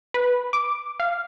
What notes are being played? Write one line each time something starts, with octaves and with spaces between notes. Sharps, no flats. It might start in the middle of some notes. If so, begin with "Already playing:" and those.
B4
D6
F5